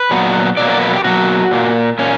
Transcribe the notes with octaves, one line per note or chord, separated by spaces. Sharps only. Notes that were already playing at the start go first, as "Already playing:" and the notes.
Already playing: B4
A#2 F#3 B3
B2 F#3 A#3 D5
D5
B4
G4
B2 F#3 A#3 F#4
A#2 A#3
A#2 A#3 C#4